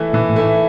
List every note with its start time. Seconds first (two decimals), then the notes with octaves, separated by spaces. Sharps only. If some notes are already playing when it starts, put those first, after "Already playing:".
Already playing: E3 A3 E4
0.13 A#2 E3
0.29 A2
0.36 A3 E4